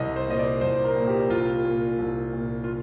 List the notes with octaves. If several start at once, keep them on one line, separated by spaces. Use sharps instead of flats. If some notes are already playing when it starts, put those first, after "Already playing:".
Already playing: C2 D#5
C5
A#2 D#5
D5
C2 C5
A#4
A#2
G4
C2 F4
A#2
C2
A#2
F4